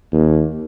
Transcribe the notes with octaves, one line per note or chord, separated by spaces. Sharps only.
D#2